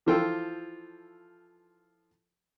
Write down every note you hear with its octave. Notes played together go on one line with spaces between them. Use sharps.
E3 F3 F4 A4 G5 E6